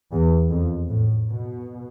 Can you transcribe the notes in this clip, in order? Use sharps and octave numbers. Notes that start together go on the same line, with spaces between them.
E2
F2
A2
B2